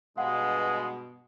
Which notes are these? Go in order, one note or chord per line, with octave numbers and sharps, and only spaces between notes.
G2 B2 G#3 F5 F#5